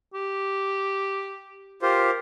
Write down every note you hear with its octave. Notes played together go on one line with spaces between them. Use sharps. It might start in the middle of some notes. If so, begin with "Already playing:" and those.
G4
F4 G4 A#4 C5